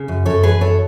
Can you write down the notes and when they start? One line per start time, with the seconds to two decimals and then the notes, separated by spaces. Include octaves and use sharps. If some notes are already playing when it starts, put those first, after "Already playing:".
Already playing: C#3
0.08 F#2
0.26 F#2 A4 C#5
0.43 E3 G#4 B4
0.61 F#2 A4 C#5